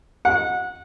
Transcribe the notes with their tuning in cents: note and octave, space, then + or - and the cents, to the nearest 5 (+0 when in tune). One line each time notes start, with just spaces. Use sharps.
F#5 -25